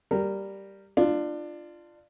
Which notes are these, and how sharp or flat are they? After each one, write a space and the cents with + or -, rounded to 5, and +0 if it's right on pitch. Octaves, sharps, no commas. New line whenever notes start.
G3 +0 A#4 -10
D4 +20 F4 -15